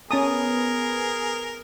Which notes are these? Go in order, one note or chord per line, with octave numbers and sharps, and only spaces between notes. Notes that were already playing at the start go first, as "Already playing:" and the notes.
B3 C#4 G#4 A#4 A5 D#6